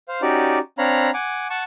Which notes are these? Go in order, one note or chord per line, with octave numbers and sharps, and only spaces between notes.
C5 F5
C#4 D#4 F#4 G4 D5
C4 D4 C#5 F5 A#5 B5
F#5 G#5 D6
F#5 A5 C#6